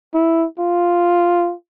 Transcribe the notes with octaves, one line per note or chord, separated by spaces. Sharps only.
E4
F4